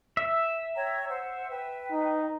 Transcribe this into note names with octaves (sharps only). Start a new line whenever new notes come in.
E5
C#5 G5 A#5
C5 F#5
B4 G5
D#4